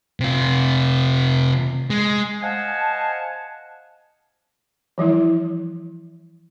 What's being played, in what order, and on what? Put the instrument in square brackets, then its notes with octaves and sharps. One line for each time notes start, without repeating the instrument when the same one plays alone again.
[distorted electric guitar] C3 F4
G#3
[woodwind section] C5 D#5 F5 F#5 G#5 A5
[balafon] E3 F3 G3 E4